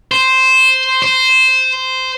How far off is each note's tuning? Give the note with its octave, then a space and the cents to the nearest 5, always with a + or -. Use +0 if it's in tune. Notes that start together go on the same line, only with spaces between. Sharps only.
C5 -5
C5 -10